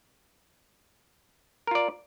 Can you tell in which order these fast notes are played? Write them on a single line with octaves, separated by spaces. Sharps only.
A#4 F4 D5